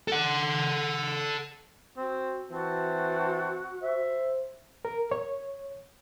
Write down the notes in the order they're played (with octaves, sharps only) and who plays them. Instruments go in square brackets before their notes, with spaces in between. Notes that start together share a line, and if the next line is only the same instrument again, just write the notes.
[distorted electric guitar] A4 F#5
[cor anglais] C4 [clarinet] F#4
[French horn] E3 [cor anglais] C4 [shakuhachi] F#4 [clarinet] A5
[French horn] C5 [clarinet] E5
[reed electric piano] A#4
C#5